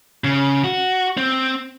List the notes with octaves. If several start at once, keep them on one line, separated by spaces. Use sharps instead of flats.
C#3
F#4
C4